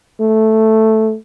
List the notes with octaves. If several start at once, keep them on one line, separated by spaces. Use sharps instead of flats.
A3